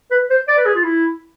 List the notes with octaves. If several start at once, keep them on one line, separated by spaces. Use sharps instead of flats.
B4
C5
D5
B4
G#4
F4
E4